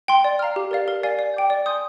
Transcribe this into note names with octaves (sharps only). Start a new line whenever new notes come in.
G5 C6
D5
F5 A#5 F6
G4
A#4 D5 F5
A#4
D5 F5 G#5
D5
G5 D6 G6
D5
G#5 C6 D#6 G6